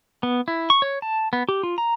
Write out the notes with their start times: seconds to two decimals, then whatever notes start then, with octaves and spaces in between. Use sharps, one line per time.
0.23 B3
0.48 E4
0.70 C#6
0.82 C#5
1.02 A5
1.33 B3
1.49 G4
1.63 F4
1.78 A#5